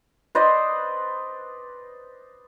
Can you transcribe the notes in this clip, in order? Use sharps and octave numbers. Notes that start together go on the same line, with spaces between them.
B4 C5 D5 D#5